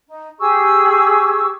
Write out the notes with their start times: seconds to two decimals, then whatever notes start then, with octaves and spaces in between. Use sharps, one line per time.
0.07 D#4
0.39 G4 G#4 C#6 E6